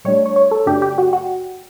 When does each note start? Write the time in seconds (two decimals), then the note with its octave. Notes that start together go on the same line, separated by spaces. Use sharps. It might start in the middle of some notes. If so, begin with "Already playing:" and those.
0.05 A2 G3 D4 C#5
0.26 C#5
0.36 C#5
0.51 A4
0.66 F#2 C#3 F#3 A3 D4 G4
0.82 G4
0.98 F#4
1.13 F#4